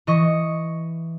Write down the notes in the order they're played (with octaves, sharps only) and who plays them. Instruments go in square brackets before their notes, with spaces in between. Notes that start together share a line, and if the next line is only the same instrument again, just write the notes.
[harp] E3 D#5 C#6